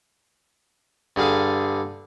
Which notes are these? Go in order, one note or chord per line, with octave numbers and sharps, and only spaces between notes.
G2 D3 G#4 F5